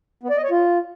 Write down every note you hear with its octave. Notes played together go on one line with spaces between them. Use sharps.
B3
D5
D#5
C#5
F4